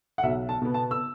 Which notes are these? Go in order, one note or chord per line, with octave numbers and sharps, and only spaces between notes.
F#5
B1 E5
A5
B2 B3
A5
E6